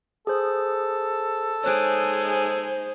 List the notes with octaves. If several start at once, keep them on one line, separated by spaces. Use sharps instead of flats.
G#4 A4 C5 D#6
G#3 D#4 G#4 C5 C#5 F#6 D7